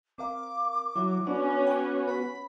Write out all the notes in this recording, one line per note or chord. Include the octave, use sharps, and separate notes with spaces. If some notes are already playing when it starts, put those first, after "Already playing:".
C4 A#4 F5 D6
F#3 E4
B3 C#4 D4 F#4
G5 D6
B4 B5